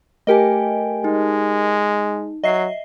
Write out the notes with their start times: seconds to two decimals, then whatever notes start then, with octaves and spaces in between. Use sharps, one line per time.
0.27 A3 G4 A#4 D#5 G5 G#5
1.04 G#3 D#4
2.44 F#3 D#5 E5 C7